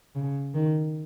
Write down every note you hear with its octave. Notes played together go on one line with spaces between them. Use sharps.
C#3
D#3